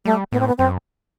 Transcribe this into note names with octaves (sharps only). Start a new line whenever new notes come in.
G3 A3
A2 B3
C4
B3
F#2 C4